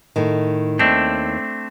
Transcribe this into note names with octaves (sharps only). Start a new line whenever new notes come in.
A2 D#3
D#2 A3 C4 D4